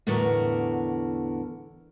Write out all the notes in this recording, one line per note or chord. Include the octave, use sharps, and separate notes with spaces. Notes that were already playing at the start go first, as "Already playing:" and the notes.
E2 A2 D3 B3 F#4 A#4